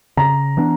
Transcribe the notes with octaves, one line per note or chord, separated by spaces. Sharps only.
C#3 A#5
E3 B3 D4